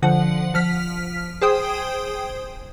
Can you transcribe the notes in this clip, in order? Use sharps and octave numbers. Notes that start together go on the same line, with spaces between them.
D3 F3 F#5
F3 F6 B6
G#4 C5 G5 D#6